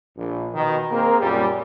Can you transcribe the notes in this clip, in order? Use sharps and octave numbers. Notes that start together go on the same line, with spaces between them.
A#1
B2 D#3
A#3 C4 G#4 A#4
F#2 A#2 G3